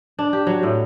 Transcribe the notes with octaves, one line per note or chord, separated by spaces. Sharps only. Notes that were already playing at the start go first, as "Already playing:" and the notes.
D4
G4
F#3
A2